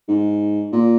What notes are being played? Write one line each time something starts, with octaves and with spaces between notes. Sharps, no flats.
G#2
A#2